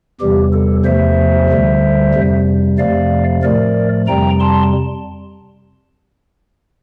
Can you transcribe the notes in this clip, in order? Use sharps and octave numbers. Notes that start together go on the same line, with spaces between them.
E2 C3 E3 G3 G4
A4
E2 C3 F3 A3 C5 E5
D2 D3 G3
F2 C3 G3
F2 C3 F3 A3 D5 F5
A2 F3 A3 A#4 D5
F2 C3 G3 G5 A#5
A5 C6